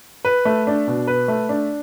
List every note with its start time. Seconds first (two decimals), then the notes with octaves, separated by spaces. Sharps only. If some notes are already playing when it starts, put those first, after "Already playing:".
0.25 B4
0.45 A3
0.67 D4
0.87 B2
1.07 B4
1.28 A3
1.49 D4